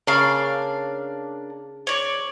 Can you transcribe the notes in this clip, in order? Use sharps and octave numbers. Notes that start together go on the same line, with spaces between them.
C#3 A#3 D4 F5
C#5 D5